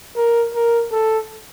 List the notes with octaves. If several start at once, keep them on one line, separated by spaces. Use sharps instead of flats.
A#4
A#4
A4